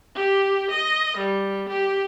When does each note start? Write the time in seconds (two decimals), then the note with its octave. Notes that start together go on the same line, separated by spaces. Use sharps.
0.15 G4
0.70 D#5
1.17 G3
1.69 G4